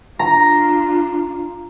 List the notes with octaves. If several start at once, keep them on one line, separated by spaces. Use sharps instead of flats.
D4 F4 A#5